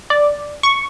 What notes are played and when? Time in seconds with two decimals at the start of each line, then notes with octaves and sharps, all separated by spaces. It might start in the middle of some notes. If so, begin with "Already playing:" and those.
0.10 D5
0.63 C#6